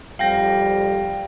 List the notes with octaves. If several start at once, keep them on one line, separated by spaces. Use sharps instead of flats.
F2 G3 F5 G5 A#6